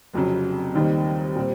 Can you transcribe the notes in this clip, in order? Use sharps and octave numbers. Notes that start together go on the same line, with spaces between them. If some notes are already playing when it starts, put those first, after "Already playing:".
F1 F2 C#3 F#3
D#2 D#3 G3 C4 D#4
A#2 G3 C4